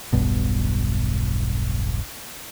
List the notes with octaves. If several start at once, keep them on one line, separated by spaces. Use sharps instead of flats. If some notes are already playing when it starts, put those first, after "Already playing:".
E1 B1 G2 B2